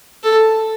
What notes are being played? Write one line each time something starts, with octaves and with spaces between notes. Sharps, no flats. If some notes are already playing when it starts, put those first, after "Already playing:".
A4